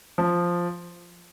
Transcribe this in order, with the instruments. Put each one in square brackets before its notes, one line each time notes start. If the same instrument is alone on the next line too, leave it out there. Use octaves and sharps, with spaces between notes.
[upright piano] F3